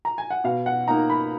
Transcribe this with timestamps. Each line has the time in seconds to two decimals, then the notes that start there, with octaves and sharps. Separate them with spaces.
0.05 A#5
0.18 G#5
0.30 F#5
0.44 B2 F5
0.66 F#5
0.88 A#3 D#4 A#5
1.10 B5